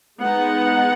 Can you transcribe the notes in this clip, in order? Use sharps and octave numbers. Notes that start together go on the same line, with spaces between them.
G#3 B3 D#4 F#5